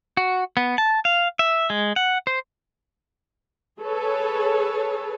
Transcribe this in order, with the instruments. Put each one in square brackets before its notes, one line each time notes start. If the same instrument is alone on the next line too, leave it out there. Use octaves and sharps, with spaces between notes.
[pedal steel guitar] F#4
B3
A5
F5
E5
G#3
F#5
C5
[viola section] G#4 A4 B4 C#5